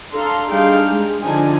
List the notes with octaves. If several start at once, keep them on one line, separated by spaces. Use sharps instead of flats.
D4 A4 F5 A#5 C6
G3 D4 D#4 G#4 F5 G5
G#3
D3 F3 D4 D#4 G#5